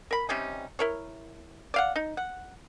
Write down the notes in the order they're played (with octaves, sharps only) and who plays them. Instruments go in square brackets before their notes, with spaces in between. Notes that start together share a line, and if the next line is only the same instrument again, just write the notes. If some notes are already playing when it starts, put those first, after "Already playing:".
[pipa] A#4 B5
C3 G3 C#4 D#4
E4 A#4 C#5
D5 F5 F#5
D#4
F#5